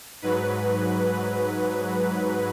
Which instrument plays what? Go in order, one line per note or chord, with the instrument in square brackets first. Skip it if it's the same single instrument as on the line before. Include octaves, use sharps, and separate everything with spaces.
[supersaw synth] G#2 F#3 B4